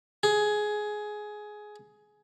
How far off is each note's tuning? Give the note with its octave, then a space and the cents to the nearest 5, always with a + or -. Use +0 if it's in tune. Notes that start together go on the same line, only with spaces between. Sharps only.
G#4 +15